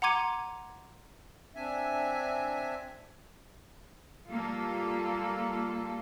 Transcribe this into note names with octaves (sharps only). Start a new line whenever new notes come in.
F#5 A#5 C6 D6 G#6 D#7
C4 D4 E5 G#5
G3 A#3 F4 A4